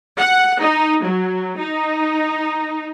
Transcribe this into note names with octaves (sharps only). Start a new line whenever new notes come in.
F#5
D#4
F#3
D#4